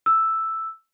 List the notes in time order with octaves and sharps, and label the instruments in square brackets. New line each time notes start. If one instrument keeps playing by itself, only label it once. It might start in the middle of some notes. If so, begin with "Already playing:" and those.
[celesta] E6